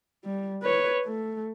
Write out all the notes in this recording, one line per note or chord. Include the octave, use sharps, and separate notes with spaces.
G3
B4 C#5
A3